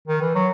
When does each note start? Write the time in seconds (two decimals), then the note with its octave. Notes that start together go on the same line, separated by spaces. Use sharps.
0.08 D#3
0.21 E3
0.35 F#3